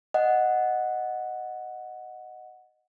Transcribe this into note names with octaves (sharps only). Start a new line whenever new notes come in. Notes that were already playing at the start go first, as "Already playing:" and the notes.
D#5 F#5